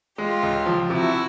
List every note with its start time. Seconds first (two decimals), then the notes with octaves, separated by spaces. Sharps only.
0.18 G#3 F4 G4
0.43 C#2
0.66 F3
0.90 C3 E4 F#4